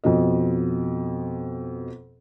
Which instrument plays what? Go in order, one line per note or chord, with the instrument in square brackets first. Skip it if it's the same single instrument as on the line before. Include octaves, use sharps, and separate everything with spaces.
[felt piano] F2 B2 D#5